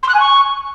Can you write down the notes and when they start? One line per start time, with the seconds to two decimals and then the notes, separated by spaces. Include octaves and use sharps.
0.03 C6
0.08 F#6
0.14 G#5
0.20 C#6